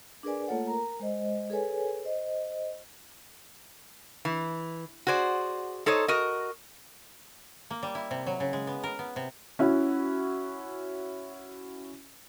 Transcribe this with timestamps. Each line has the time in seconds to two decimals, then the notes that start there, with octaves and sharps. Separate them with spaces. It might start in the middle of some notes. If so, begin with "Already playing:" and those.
0.23 D4 G#4 A#4 B4 D5 G#5
0.48 A3 A#3 F4 A4 C#5 F#5
0.67 A#4 A#5
1.00 G#3 C5 D#5
1.50 G#4 A4 B4 C#5 G#5
2.03 C5 D#5
4.25 E3
5.07 F#4 G#4 C5 D5
5.86 D#4 A4 C5 C#5 D#5
6.08 F#4 A#4 D#5
7.70 A#3
7.83 G3
7.95 E4
8.11 C3
8.26 F#3
8.40 C#3
8.53 G#3
8.67 B3
8.83 A#4
8.99 B3
9.16 C3
9.59 C#4 E4 F#4